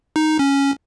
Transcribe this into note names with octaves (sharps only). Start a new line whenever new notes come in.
D#4
C#4